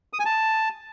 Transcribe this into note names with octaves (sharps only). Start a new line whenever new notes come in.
D#6
G#5
A5